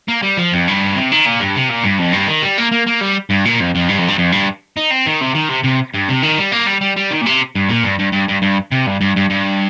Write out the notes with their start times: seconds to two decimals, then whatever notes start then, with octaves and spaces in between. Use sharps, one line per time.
0.09 A#3
0.23 G3
0.37 F3
0.53 F2
0.68 G2
0.96 C3
1.12 D#3
1.26 A#2
1.40 G2
1.55 C3
1.69 A#2
1.84 G2
1.99 F2
2.13 G2
2.27 D#3
2.42 G3
2.58 A#3
2.72 A#3
2.87 A#3
3.01 G3
3.30 G2
3.45 A#2
3.60 F2
3.75 F2
3.89 G2
3.98 F2
4.08 G2
4.18 F2
4.32 G2
4.77 D#4
4.91 C4
5.06 D#3
5.21 C3
5.35 D#3
5.49 C3
5.64 C3
5.94 G2
6.09 C3
6.23 D#3
6.38 G3
6.52 A#3
6.67 G3
6.81 G3
6.96 G3
7.11 D#3
7.21 A#2
7.26 C3
7.55 G2
7.69 A#2
7.84 G2
7.99 G2
8.13 G2
8.29 G2
8.42 G2
8.72 C3
8.87 G2
9.01 G2
9.16 G2
9.30 G2